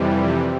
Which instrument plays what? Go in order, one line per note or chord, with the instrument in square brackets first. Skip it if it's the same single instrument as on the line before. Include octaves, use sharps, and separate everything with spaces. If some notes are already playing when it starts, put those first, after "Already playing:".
Already playing: [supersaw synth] F2 C3 E3 G3